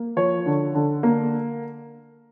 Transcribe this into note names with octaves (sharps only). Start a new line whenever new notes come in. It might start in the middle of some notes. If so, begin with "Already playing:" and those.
Already playing: A#3
F3 C#5
D3
D3
A#3